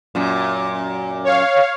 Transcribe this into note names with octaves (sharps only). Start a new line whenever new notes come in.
F#2 A#2
C#5 F5